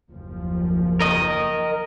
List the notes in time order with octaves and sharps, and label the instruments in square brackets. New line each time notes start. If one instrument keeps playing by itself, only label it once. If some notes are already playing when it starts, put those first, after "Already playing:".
[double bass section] F#1 D#2 F3
[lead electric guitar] A#4 D#5